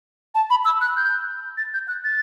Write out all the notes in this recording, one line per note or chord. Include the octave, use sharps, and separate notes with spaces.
A5
B5
E6
F#6
G6
A6
G6
F#6
A6